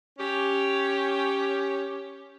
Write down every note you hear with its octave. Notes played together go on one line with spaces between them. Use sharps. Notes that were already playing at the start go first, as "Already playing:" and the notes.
C#4 G4